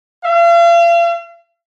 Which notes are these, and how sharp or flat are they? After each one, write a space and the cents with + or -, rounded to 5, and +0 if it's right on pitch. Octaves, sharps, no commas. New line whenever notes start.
F5 -40